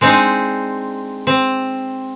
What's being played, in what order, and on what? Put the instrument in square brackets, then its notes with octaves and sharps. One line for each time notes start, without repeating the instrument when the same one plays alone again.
[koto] G#3 C4 D4 D#4
C4